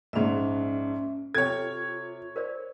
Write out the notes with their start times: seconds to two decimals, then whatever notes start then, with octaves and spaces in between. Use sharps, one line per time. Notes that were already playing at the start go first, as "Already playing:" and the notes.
0.13 A#1 G#2 C#4 E5
1.35 C3 F4 A4 C#5 G5 G#6
2.36 A#4 C5 D5